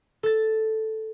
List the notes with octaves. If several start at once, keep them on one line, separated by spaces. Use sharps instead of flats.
A4 A6